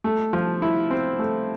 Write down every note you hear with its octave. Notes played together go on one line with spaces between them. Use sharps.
A3
F3
E4
C4
A3